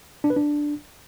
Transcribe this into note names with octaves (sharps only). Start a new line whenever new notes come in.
D4
B4
D4